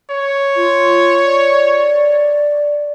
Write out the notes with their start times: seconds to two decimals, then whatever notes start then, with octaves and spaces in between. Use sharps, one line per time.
0.11 C#5
0.56 F4
1.26 D5